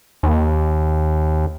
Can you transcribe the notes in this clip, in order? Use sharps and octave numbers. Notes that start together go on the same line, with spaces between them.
D#2